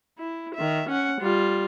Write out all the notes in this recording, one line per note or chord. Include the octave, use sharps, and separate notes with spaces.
E4
D#3 E5
C#4 F#5
G3 F4